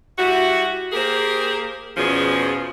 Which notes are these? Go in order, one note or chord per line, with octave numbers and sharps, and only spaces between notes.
G3 E4 F#4
A#3 G4 G#4 A#4 C5
E2 B2 F3 C#4 G#4